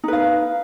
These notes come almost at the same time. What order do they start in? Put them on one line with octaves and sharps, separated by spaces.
D#4 B4 F5